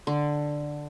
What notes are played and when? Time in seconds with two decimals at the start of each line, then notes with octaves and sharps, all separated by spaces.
0.07 D3